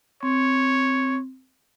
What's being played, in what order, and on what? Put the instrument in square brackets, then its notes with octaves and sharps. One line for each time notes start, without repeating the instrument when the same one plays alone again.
[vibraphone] C4 [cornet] C#5